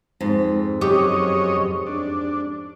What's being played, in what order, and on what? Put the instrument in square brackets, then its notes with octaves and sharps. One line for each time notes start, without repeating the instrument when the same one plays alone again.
[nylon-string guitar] F2 G#2
[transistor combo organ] F#2 C#5 D#5 [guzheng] G4
[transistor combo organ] D4